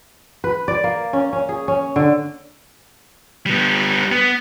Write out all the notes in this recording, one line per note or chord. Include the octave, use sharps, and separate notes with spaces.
B4
D5
A#3
C#4
C#4
G#4
C#4
D3
G3 B3
B3